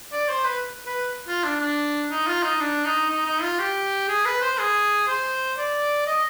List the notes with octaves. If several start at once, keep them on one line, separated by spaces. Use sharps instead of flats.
D5
C5
B4
B4
F4
D4
D4
D#4
F4
D#4
D4
D#4
D#4
D#4
F4
G4
G#4
B4
C5
G#4
C5
D5
D#5